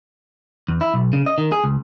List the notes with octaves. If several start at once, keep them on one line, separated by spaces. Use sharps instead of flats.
E2
E4
B1
C#3
D#5
D#3
G#4
C#2